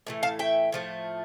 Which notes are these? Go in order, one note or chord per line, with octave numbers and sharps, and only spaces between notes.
A2 E3 A3
F5 A5
E5 G5
A2 F3 A3